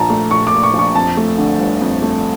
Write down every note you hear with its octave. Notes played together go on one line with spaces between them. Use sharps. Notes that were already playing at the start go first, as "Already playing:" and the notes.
Already playing: A#1 A#2 A5 A#5
A3
A#1 C#6
D6
A#2
C#6
A#1
C#6
F2 A5
A3
D3
G1
F2
A3